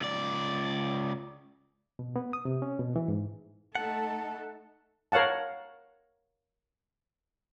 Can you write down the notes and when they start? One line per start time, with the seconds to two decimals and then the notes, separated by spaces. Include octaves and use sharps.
0.01 C#2 D5
1.99 B2
2.16 B3
2.33 D#6
2.45 C3
2.62 C#4
2.79 B2
2.96 E3
3.08 G#2
3.75 A3 D#4 A4 F#5 A5
5.12 A#4 C#5 F5 F#5 A5